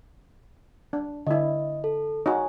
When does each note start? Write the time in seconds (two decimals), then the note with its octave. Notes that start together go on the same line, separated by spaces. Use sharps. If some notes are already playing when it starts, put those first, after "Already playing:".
0.93 D4
1.27 D3 E4 D#5
1.84 A4
2.26 D#4 F#4 C#5 G#5